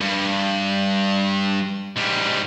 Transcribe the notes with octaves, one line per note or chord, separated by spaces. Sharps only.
G2
G#2 G3